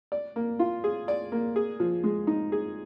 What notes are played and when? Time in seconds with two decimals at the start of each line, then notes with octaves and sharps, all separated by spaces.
0.12 D5
0.36 A#3
0.59 F4
0.84 G#4
1.08 D5
1.32 A#3
1.56 G#4
1.80 F3
2.04 G#3
2.27 D#4
2.52 G#4